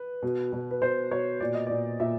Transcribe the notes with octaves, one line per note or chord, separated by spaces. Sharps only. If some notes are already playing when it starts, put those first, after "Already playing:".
Already playing: B4
B2
B2
B4
B2 C5
B2 C#5
A#2 D5
D#5
A#2 D5
A#2 E5